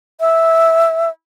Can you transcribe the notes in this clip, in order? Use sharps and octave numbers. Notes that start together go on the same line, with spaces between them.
E5